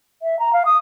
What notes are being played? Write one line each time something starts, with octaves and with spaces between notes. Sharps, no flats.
E5
A#5
F5
D#6